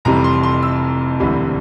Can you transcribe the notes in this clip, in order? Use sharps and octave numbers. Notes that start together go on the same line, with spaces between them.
F1 F2 C3 E3 G3 A#5
C6
C6
E6
E1 D2 C3 E3 G3